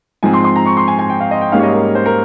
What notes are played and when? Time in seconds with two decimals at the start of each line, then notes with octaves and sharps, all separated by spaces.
0.23 G#2 F3 G#3 C4 G#5
0.33 C6
0.44 C6
0.56 A#5
0.66 C#6
0.77 C6
0.88 G#5
0.99 G#5
1.10 G5
1.20 F5
1.31 D#5
1.41 G5
1.52 G#2 G3 A#3 C#4 F5
1.59 C#5
1.63 D#5
1.73 A#4
1.95 C5
2.06 A#4